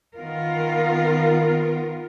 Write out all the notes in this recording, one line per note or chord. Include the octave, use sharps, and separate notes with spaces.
D#3 B3 F4 A#4